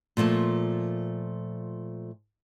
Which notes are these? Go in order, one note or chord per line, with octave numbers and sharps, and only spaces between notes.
A#2 F3 A3 A5